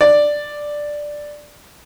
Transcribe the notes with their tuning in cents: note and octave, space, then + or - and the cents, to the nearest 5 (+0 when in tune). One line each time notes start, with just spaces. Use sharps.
D5 +5